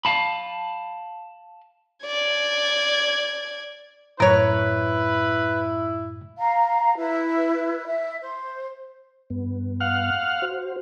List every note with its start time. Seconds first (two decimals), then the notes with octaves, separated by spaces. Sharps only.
0.05 F5 A5 B5
2.06 D5 G#6
4.20 F#2 A2 E4 A#4 B4 C#5
6.38 F5 A#5
6.96 E4 B4
7.86 E5
8.21 C5
9.30 G2 B3
9.80 F5 F#5 F6
10.42 F#4 C5